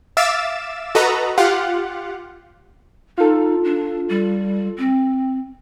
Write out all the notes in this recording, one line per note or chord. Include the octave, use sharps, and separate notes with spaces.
E5 F5 D6 E6 A6 E7
F#4 A4 B4 D#5 A#5
F4 G4 F5 F#5
D#4 F4 A4
D4
G3
C4